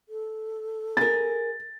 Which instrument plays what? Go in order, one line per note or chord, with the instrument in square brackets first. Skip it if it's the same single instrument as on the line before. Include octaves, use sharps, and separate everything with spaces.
[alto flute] A4
[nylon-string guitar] G#4 A#4 [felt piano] A6